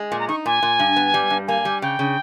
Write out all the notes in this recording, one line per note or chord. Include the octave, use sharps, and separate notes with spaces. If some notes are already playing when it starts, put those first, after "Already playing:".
Already playing: G#3
A#2 G#5
A#5
D#4 C#6
A#2 G#5
A#2
G2
B3
G3
G2
A#3 G#5
G3
C#3 G5
C#3